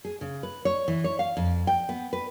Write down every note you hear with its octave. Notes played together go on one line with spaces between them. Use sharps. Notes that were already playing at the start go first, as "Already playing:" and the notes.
G#4
C#3
B4
C#5
E3
C#5
F5
F2
G5
B3
B4